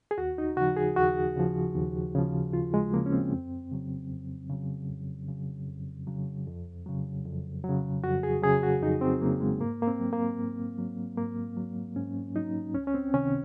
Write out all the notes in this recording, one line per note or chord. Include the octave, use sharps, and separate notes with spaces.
G#4
D#2 F#4
D#4
C#3 F3 F#4
G#4
D#2 F#4
C#3 F3
D#2
C#3 F3
D#2 F4
G#3
C#3 F3 A#3
C#4
C4
F2
C#3 F#3
F2
C#3 F#3
F2
C#3 F#3
F2
C#3 F#3
F2
C#3 F#3
F2
F#3
C#3
F2 F#4
G#4
C#3 F#3 G#4
F#4
F2 D#4
C4
C#3 F#3 A#3
G#3
G#2 A#3
A#3
C4
F#3
A#3
G#2
F#3
G#2 A#3
F#3
G#2 C#4
F#3 D#4
C#2 C#4
C#4
C4
C3 D#3 C#4